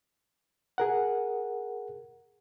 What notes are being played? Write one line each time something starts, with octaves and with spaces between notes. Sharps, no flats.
G#4 A#4 F#5